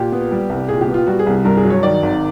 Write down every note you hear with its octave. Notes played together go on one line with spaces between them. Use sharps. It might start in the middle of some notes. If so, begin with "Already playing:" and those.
Already playing: A#2 G4
B3
G3
C2
A#2 G#4
G4
B3
F4
G3 F#4
G#4
C2
G2 A#4
G#4
F#3
C#5
D#3 D5
G#1